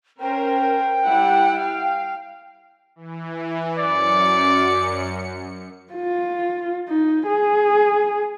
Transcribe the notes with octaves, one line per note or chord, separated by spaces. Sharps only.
C#4 A#4 C5 G5
G3 E4 F#5
F5
E3
F#2 D5 C#7
F4
D#4
G#4